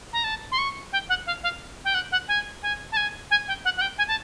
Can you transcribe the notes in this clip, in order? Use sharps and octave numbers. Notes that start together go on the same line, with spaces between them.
A#5
A5
C6
C#6
G5
F#5
F5
F5
G5
F#5
F#5
G#5
G#5
A5
G#5
G#5
G5
F#5
F#5
G5
G#5
A5